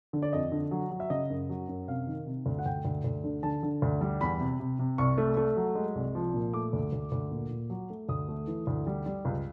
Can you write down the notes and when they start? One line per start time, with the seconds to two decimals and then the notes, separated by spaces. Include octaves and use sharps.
0.13 D3
0.22 D5
0.33 F2 D#5
0.52 D3
0.71 F#3
0.91 F#3
1.00 E5
1.10 C#3 D#5
1.30 F#2
1.49 F#3
1.69 F#2
1.88 C3 F5
2.07 D#3
2.27 C3
2.46 D2
2.59 F#5
2.66 D2 G5
2.85 D2
3.04 D2
3.24 D3
3.43 D3 A5
3.63 D3
3.82 D2
4.01 G3
4.21 E2 B5
4.40 C3
4.60 C3
4.79 C3
4.98 C2 C#6
5.18 A3
5.37 A3
5.57 F#3
5.75 G#3
5.95 C2
6.15 F3
6.34 A#2
6.54 A3 D6
6.73 D2
6.92 D2
7.12 D2
7.31 A#2
7.51 A#2
7.70 F#3
7.90 A3
8.09 D2 D#6
8.28 A3
8.47 E3
8.67 D2
8.87 G3
9.06 G3
9.25 C#2